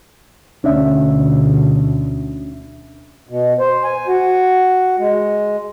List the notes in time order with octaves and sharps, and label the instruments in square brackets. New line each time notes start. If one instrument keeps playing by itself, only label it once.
[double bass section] D2 B2 [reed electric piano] C#4 D4 E5
[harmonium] B2
C5
G#5
F#4
G#3